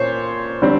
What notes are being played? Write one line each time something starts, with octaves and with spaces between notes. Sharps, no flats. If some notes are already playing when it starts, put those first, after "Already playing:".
Already playing: A#2 C5 C#5
D3 G3 C4